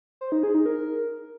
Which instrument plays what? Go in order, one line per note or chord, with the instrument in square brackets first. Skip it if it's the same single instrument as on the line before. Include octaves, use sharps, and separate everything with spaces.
[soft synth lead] C5
D#4
G#4
D#4
A#4